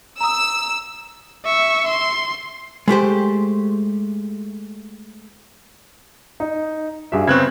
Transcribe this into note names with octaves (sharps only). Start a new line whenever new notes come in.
A#5 D#6 E6
E5 C#6
C6
G#3 A3 G4 C5
D#4
G2 F#4 G#4 E5
C#3 B3 C4 C#6 F#6 G#6